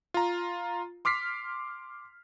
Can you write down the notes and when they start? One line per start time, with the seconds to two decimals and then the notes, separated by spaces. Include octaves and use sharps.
0.14 F4 A#5
1.05 C6 D6 F6 B6 C7